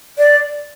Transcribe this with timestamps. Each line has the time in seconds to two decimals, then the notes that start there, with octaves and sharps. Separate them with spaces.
0.18 D5